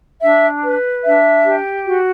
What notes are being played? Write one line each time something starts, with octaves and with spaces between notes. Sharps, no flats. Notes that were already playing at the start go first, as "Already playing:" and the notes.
D4 E5
B4
D4 E5
G4
F#4